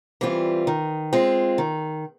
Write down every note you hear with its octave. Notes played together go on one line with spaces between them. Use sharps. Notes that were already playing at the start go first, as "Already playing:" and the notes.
E3 G3 C4 F4
D#3
G#3 C4 F4
D#3